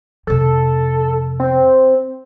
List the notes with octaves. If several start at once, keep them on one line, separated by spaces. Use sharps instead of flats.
F2 C3 A4
C4